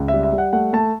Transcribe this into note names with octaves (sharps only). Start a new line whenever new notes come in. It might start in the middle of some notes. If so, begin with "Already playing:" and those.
Already playing: C#2
G3 E5
E5
G3
F#5
A3 F#5
A3 A5